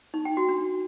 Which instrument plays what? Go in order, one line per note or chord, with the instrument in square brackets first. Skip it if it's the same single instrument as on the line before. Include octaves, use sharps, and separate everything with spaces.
[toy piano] D#4
G5
F#4
D4